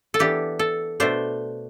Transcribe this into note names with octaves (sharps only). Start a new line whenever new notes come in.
A4
E3 B3 D4 G4
A4
B2 A3 D4 C5